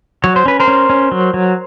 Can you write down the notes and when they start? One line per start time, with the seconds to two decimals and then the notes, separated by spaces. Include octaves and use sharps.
0.24 F#3 C#5
0.36 C5
0.46 C#4 B4
0.60 A#4 C5
0.68 C#4
0.90 C#4
1.12 F#3
1.34 F#3